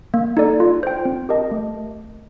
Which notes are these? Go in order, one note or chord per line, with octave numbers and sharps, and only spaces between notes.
A#3
D#4 A4 D5
F4
C5 G5
C4
G4 A#4 D#5 A5
A3